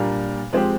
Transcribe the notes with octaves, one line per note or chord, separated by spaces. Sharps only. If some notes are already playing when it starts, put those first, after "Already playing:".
Already playing: A#2 G3 A#3 D4
F3 G#3 C4 G4